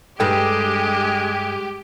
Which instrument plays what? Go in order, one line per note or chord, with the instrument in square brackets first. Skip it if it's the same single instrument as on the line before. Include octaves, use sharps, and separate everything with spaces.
[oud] G2 G3 A4 [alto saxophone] G#3 [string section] G4 [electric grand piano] G5